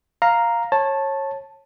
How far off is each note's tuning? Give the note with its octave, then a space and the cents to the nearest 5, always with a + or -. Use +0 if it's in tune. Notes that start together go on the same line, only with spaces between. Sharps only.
F5 +0 A#5 +0
C#5 -25 A5 +0